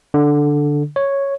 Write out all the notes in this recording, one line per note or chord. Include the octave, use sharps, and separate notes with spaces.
D3
C#5